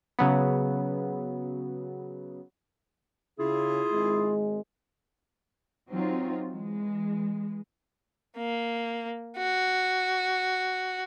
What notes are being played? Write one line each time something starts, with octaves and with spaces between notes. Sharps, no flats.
C#3 F#3 B3
C#3 E4 F4 G#4
G#1 G#3
F#3 C4 D#4 F4
E3 G#3
A#3
F#4